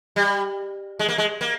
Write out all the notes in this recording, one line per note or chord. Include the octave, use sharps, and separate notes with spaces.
G3
G#3
A#3
G#3
A#3